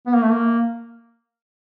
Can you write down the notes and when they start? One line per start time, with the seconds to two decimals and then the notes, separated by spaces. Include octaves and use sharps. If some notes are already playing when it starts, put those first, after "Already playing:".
0.07 B3
0.14 A#3
0.22 A3
0.31 A#3